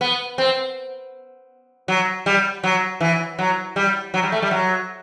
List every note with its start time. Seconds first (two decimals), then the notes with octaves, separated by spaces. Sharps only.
0.01 B3
0.38 C4
1.88 F#3
2.26 G3
2.64 F#3
3.01 E3
3.39 F#3
3.76 G3
4.14 F#3
4.23 G3
4.32 A3
4.42 G3
4.51 F#3